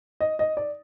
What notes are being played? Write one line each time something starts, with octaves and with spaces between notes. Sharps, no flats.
D#5
D#5
D5